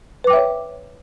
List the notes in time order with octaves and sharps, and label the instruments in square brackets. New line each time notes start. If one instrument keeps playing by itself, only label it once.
[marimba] B4
D6
G5
E5
C#5